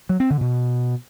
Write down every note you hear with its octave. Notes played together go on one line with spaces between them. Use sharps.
F#3
C4
D3
B2